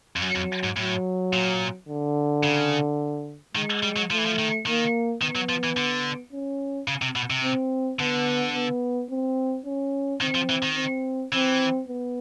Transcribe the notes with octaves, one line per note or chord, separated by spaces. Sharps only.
F2
F#2 F#3
F2
G#2
A2 F#3
A#2
D3
C#3
D#3 G#3
G3
F#3
F3 A3
E3
F3
D#3
D#3 A#3
D#3 B3
F#3
F3
E3
D3
C#4
C#3
C3
B2
C3
C4
D3 B3
B3
C4
C#4
D#3 C4
F3
E3
D#3
C4
E3 C4
B3